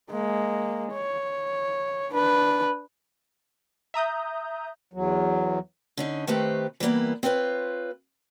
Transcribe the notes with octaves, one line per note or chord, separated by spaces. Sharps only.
G#3 A#3
C#5
D4 B4
E5 A#5 D#6 G6
E2 F#3
D3 C#4 D#4
D#3 A3 C4 G4 B4 C5
E3 G3 A#3 B3 E4
C4 F4 A#4 B4 C#5